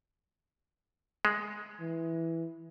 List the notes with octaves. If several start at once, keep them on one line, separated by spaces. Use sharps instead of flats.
G#3
E3